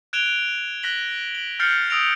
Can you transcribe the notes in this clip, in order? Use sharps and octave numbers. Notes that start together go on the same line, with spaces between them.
F#6 G#6 D7 E7 F7 G7
F#6 A#6 B6 F#7 G7
F#7
F6 G6 A6 C7 C#7 F#7
D#6 E6 A#6 D7 F7